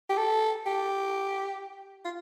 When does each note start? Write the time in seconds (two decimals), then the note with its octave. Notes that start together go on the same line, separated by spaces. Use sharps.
0.10 G4
0.17 A4
0.66 G4
2.05 F4